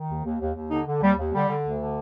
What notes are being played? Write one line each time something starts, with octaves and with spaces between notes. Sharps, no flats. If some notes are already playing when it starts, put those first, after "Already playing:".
Already playing: D#3
D#2
D#2
D#2
D#2
D3 D#4
D3
D#2 G3
D#2
D3 G3
D3
D2
D3